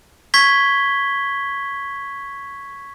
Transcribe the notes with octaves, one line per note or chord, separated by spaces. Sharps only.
C#6 G#6 B6 G7